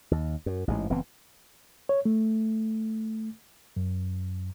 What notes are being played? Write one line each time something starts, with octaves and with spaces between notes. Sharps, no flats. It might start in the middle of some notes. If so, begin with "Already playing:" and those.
D#2
F#2
A1 G#2 C3 G#3
F#1 E3 B3 C4
C#5
A3
F#2